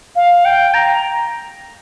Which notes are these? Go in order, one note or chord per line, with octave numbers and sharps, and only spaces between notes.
F5
G5
A#5